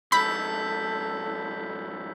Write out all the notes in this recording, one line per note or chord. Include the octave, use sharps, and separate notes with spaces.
F2 G#2 A4 B5 E6 G6 B6